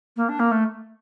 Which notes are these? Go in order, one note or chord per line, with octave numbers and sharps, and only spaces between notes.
A#3
D4
A#3
A3